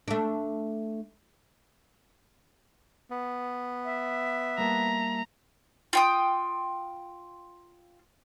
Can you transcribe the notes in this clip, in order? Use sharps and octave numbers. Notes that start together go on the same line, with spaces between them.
A3 D4
B3
E5
G3 A#3 A5 A#5
F4 G5 D#6